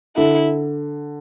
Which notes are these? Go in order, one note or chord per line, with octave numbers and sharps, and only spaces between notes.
D3 E4